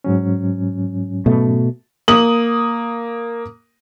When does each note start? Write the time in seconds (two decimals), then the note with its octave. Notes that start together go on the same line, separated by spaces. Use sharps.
0.04 G#2 F#3 C#4
1.26 B2 A3
2.08 A#3 D#6 F#7